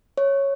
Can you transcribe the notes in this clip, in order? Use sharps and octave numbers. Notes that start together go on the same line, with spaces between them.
C#5